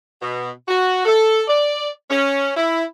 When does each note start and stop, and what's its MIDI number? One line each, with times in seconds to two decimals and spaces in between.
0.22 0.50 47
0.68 1.04 66
1.05 1.42 69
1.48 1.88 74
2.11 2.50 61
2.57 2.83 64